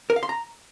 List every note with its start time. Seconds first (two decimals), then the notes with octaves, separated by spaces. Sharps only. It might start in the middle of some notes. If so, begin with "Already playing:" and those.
0.10 A#4
0.16 F5
0.23 C6
0.29 A#5